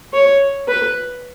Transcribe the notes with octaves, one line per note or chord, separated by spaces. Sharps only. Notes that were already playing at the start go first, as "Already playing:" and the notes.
C#5
B4